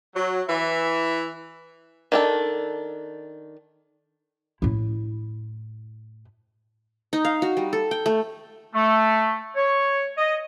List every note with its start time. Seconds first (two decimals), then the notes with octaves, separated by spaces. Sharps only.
0.15 F#3
0.47 E3 E5
2.12 D#3 D4 A4
4.62 A2 E4
7.13 D#4
7.25 F5
7.42 F#4
7.57 G3
7.73 A4
7.91 G5
8.06 A3
8.75 A3
9.55 C#5
10.18 D#5